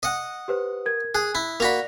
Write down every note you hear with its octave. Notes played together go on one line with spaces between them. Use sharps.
D#5 F#5
G4 B4 C5
A#4 G#6
G#4 F#6
E4
A#3 F#4 D5 B5 A#6 F7